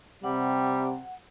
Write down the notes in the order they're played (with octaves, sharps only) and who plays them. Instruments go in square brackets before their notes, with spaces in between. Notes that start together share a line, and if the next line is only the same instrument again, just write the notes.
[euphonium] C3 [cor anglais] G3 [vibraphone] F#5